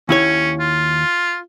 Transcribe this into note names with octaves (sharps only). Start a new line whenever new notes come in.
D#2 C#4 E4 C#5
F4